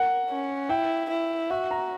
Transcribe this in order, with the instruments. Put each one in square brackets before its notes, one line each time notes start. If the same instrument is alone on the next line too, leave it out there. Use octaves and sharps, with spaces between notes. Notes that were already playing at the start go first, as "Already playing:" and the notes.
Already playing: [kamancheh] A#4 [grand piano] F#5
[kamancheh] C#4
[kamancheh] E4 [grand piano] G5
[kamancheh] E4
[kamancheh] F#4 [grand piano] E5
[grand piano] A#5